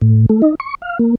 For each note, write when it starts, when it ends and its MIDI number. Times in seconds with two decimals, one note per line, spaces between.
0.02 0.26 45
0.29 0.42 57
0.42 0.55 63
0.60 0.75 85
0.82 0.98 77
0.99 1.15 58